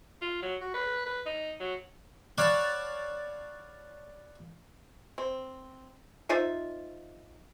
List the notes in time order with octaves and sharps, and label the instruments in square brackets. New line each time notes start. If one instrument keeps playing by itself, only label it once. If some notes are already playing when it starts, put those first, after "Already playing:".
[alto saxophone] F4
F#3
F#4
B4
B4
D#4
F#3
[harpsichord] C#5 D5 F5 F#5 A5 B5
[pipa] C4
D#4 F4 C5 E5